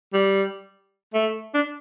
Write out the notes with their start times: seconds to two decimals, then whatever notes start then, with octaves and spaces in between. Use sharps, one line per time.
0.14 G3
1.14 A3
1.54 D4